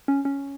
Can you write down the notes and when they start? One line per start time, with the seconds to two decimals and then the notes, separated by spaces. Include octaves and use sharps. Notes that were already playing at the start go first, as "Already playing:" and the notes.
0.08 C#4
0.25 C#4